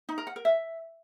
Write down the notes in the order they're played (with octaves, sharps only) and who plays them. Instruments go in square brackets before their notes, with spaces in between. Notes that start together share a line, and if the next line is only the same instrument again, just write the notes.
[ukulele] D#4
A#4
F#5
A#4
E5